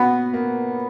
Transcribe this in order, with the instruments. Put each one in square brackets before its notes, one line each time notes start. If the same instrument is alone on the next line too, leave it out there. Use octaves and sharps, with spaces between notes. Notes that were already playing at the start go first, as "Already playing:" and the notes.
Already playing: [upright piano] A#2 C#4 F#4 [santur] B3
[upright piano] A#3